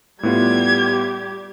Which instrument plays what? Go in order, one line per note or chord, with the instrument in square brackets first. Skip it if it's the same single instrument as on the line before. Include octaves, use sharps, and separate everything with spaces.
[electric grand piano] A2 B3 F4 [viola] G3 G4 [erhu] G#6